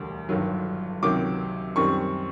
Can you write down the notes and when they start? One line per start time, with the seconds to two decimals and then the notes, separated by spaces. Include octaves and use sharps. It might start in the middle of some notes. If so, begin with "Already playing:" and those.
Already playing: E1 D2 D3 G3
0.29 G1 G2 D#3 F#3
1.03 C#2 C3 D#3 F#3 D6
1.76 F#2 D#3 G3 C4 C#6